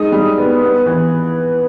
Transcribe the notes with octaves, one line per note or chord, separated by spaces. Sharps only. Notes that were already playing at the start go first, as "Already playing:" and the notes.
Already playing: G#3 D#4 D#6
G3
B3
B3
E3